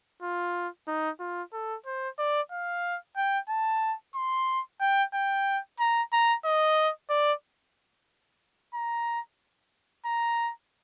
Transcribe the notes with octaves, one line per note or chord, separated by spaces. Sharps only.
F4
D#4
F4
A4
C5
D5
F5
G5
A5
C6
G5
G5
A#5
A#5
D#5
D5
A#5
A#5